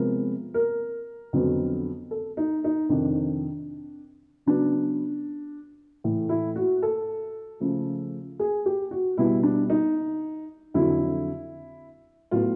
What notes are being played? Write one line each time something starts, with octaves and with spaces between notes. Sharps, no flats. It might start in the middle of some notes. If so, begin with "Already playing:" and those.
Already playing: C3 F3 G#3 B3 A#4
A#4
F2 D3 F#3 B3
A4
D#4
D#4
F2 C3 D#3 D4
C#3 F#3 B3 D4
A2 E3 A3
E4
F#4
A4
C#3 F3 A3
G#4
G4
F#4
B2 G3 B3 E4
D4
D#4
F2 D3 F#3 E4
A2 F#3 B3 F4